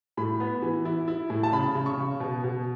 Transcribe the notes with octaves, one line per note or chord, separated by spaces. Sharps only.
A2 B5
B3
E3
E4
E4
A2
A5
C#3 B5
C#3
C#6
C#3
B2
B2